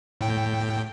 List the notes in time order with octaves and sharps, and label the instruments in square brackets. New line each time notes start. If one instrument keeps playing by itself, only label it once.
[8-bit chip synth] A2 G5